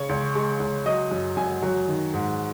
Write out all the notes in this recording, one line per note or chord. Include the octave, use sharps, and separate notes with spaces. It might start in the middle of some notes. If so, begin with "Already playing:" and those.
Already playing: C#3 C#5
C#2
G#3
C#2
F#3 D#5
F#2
F#2 G#5
F#3
D#3
G#2